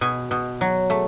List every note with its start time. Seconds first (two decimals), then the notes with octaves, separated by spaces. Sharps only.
0.01 B2 G#5
0.31 B2
0.61 F#3
0.90 A3